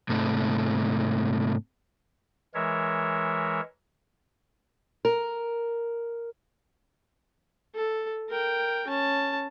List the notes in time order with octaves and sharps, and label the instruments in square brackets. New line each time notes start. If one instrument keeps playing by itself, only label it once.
[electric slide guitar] G#2 C3 A3
[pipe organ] E3 G#3 A#4 C#5 E5
[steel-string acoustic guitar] A#4
[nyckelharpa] A4
A#4 G5
C#4 A5